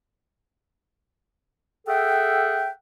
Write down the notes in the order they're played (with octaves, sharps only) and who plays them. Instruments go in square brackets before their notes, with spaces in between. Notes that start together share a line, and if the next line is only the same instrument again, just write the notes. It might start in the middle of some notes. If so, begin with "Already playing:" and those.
[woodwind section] G#4 A4 E5 F#5 G5